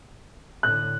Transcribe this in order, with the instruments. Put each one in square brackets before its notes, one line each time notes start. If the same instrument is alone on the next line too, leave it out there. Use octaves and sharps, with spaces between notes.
[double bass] A2 D3 [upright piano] F#6